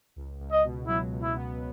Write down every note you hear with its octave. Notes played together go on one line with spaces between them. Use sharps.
C#2
C#2
D#5
B2
F#3 E4
C#2
E4
B3